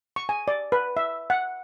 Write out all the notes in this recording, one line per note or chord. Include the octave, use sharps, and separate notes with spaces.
C#6
G#5
D5
B4
E5
F#5